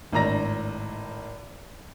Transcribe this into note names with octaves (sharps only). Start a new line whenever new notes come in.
G#1 A2 D4 A#5 A#6